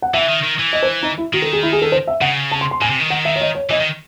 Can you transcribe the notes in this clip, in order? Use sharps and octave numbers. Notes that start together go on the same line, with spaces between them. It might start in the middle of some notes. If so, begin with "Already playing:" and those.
F#5
E3 E5
D#3
D#3
E3
D#5
C5
D#4
E4
D#3 F#4
A4
G#4
E4
G#4
A4
C5
E5
C#3 F#5
A5
C6
C6
A2 G#5
C3
D#3
F#5
E5
C#5
D#5
C#5
E3 D#5
D#3